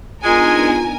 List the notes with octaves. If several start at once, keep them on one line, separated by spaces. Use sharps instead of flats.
G#3 B3 D4 D#4 F4 A#4 G#5